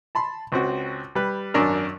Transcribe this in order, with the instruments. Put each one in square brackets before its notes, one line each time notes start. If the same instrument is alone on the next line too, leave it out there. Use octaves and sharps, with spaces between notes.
[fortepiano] A5 B5 C6
C#2 C4 F#4
G3 B4
G#1 F#2 D4 A#4